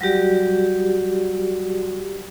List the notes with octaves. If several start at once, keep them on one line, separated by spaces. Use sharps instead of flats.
F#3 G3 F#4 G4 D5